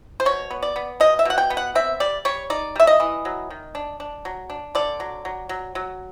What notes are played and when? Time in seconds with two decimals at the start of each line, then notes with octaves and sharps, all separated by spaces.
0.20 C5
0.25 B2 C#5
0.50 B3
0.63 D5
0.76 B3
1.00 B2 D#5
1.19 E5
1.25 B2 F#5
1.38 G5
1.50 B3
1.57 F#5
1.75 C4 E5
2.00 G3 D5
2.25 G3 C#5
2.50 D#4 D5
2.76 G3 E5
2.87 D#5
3.00 E3
3.25 F#3
3.50 D#3
3.75 D4
4.00 D4
4.25 F#3
4.50 D4
4.75 D3 D5
5.00 F#3
5.25 F#3
5.49 F#3
5.75 F#3